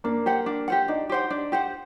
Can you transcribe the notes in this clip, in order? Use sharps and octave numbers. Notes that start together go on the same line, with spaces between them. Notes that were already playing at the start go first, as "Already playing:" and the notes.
A#3 D4
G4 C5 F#5
D4
G4 C5 F#5
D4 D#4
G4 C5 F#5
D4
G4 C5 F#5